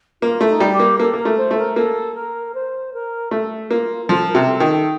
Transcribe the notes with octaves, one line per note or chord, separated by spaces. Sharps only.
A#3 F4
A3
D#4
G3
G4
A#3
A#3 A4
A#3
A#4
A3
C5
A3
A#4
A#3 A4
A#4
C5
A#4
A3 A4
A#3 F4
A#4
F3 A4
A#4
C3
A4
D#3
A4